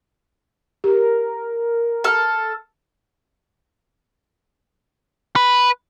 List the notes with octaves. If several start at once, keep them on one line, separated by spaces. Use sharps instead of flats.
G4 A#4
A4 F6
B4